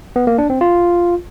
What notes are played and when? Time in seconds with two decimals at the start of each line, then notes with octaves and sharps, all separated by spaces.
0.16 B3
0.27 A#3
0.38 D4
0.50 C4
0.61 F4